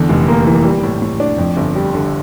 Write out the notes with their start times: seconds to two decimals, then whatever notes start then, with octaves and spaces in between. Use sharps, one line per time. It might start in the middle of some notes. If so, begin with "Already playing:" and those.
Already playing: E2 D3
0.09 F1
0.28 A#3
0.47 E3
0.64 G3
0.83 A2
1.02 A2
1.20 D4
1.38 F2
1.57 G1
1.76 G3
1.94 D3